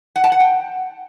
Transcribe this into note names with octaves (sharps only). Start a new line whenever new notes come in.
F#5
A5
F#5
G5